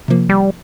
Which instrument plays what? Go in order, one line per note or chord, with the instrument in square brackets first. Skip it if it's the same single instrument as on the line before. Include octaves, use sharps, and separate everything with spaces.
[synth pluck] C3 F3 A#3
[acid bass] G3